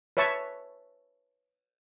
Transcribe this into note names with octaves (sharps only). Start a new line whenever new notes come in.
B4 C#5 E5 A5 C#6